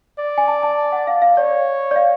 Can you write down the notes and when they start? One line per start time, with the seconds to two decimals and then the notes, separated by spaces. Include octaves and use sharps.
0.19 D5
0.38 G#5
0.48 A5
0.63 A5
0.92 F#5
1.07 F5
1.22 F5
1.37 C#5 D5
1.91 D5
1.96 F5